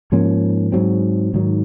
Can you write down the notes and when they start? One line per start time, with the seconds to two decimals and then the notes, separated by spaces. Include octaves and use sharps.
0.12 G#2 F3 A#3 C#4
0.72 G#2 F#3 C4
1.34 G#2 D#3 F#3